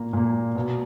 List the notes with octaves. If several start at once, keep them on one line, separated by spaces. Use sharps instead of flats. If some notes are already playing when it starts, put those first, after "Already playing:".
Already playing: A#2 A#3 A#5
A#2 A#3
B2 A#3